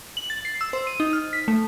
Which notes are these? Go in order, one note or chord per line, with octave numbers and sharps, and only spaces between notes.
F#7
A6
C7
E6
C5
D#7
D#4
F6
B6
A3